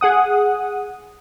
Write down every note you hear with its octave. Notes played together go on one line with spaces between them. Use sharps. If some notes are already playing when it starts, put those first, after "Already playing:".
G#4 F#5 D#6